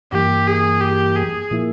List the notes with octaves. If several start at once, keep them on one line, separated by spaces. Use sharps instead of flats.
G2 E3 A#3 G4
G#4
G4
G#4
A#2 F3 A#3 E4